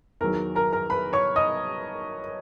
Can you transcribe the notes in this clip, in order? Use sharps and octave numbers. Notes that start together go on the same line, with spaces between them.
E2 D#3 F#3 A#4
A#4 A#5
A#4 A#5
B4 B5
C#5 C#6
D#5 D#6